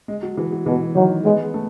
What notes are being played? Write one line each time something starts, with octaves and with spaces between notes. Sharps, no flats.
G#3
F#3
E3
F#3
B2 E3
D#3 F#3
G#3 B3
A3